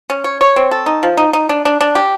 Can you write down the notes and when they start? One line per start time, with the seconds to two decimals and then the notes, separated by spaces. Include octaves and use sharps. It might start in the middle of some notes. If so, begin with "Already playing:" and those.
0.10 C#4
0.24 C#5
0.41 C#5
0.56 C4
0.71 A4
0.86 D#4
1.03 F3
1.17 D#4
1.33 D#4
1.49 D4
1.65 D4
1.81 D4
1.95 G4